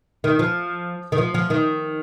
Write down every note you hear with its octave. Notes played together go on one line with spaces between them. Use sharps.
D#3
F3
D#3
F3
F3
D#3